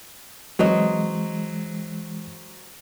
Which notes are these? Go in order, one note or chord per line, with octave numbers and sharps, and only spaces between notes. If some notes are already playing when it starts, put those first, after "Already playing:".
E3 F#3 G#3 C4 B4 C#5 D#5